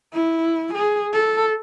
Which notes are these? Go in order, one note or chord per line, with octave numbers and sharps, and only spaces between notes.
E4
G#4
A4